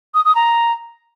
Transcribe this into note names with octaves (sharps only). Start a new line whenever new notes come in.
D#6
D#6
A#5